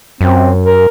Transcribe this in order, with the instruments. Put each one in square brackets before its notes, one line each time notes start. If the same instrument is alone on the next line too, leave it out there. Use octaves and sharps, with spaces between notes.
[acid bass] F#2 [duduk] C4
[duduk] A#4